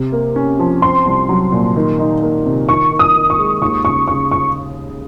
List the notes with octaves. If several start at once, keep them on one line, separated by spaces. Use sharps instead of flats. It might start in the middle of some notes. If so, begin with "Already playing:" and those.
Already playing: C3
A#3
C#4
F3
C4 C6
C2
F#3
A#2
D#3
D#4
A#3
C3
D#3 C#6
D#3
D#6
D#3
C#6
G#3
D#2 C#6
C#3 C#6
C#3 C#6
C#6